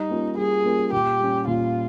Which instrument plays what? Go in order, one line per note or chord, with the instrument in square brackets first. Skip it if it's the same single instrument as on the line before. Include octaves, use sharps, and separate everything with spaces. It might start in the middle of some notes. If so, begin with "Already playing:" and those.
Already playing: [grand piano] G3 [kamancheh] D#4
[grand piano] A#3 C#4 F4 A#4
[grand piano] G3 [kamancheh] G#4
[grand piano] A#3 C#4 F4 A#4
[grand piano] A#2 [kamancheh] G4
[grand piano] G3 C#4
[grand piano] A#2 [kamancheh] F4